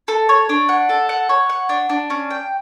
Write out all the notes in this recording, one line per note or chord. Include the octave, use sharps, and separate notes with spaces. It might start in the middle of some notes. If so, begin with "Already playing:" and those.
A4
C#5
D4
F#5
A4
F#5
C#5
F#5
D4
D4
C#4
G5